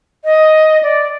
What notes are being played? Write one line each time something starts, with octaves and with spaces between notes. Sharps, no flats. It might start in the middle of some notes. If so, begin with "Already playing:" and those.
D#5
D5